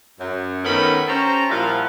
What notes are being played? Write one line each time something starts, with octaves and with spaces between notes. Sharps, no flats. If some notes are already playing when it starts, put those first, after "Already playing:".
F#2
D#3 A3 B3 C#4 A#4 B5
C#4 G4 C5 A5 A#5
A#2 F3 G3 E4 F5 F#5